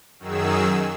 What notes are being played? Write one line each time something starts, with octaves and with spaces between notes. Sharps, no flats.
F#2 D#3 F#3 G#4 E6